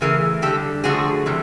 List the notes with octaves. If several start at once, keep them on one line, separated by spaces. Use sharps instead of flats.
C#3 E3 A3 G#4 A#4
D3 G3 G4 A4
D3 F3 A3 F#4 G#4
C3 E3 G3